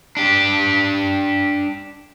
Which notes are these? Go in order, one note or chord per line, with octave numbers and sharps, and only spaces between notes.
D4 G4